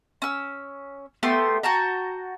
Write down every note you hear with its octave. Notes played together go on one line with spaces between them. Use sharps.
C#4 E6
A3 B3 G4 C6
F#4 G5 A5 A#5